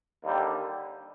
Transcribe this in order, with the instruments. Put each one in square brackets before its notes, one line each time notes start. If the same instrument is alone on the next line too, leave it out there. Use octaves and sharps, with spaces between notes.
[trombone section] D#2 D3 G3